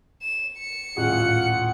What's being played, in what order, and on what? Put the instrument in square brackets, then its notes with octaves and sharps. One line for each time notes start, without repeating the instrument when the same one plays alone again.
[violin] E7
C#7
[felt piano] D#1 A1 G#4 [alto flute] F4 [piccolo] F#5